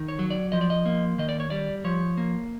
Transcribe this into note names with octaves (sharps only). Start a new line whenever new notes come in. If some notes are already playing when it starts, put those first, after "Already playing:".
Already playing: D#3
C#5
F#3
D5
F3 D#5
D5
D#5
A#3
D#3 D#5
D5
C#5
G3 D5
F3 C#5
A#3